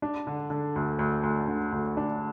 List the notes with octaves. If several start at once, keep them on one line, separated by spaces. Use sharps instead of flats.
D4
D3
D3
D2
D2
D2
D3
D2
D4